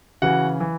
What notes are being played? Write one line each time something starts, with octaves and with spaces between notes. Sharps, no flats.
C#3 E3 F#4 F#5
E3